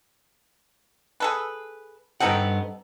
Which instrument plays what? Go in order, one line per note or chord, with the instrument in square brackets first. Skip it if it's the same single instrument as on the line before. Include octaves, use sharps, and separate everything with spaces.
[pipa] G#4 A4 B4
[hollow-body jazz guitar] G2 B3 F#5 [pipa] C4 D#4 A4